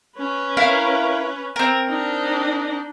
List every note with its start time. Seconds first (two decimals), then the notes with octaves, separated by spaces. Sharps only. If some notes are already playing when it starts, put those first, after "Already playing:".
0.18 C#4 B4
0.57 E4 A#4 F5
1.56 C4 A#4
1.89 D4 D#4